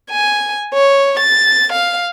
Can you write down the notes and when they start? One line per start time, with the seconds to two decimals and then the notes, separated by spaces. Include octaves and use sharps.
0.11 G#5
0.74 C#5
1.19 A6
1.72 F5